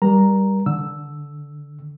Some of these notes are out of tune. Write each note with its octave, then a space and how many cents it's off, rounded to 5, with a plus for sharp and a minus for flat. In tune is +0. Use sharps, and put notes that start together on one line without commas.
G3 +0 A#4 +35 A#5 +0
D3 -10 E6 +0